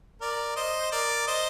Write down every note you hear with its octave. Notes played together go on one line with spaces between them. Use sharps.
A#4 D5
C5 D#5
C5
A#4 D5
C5 D#5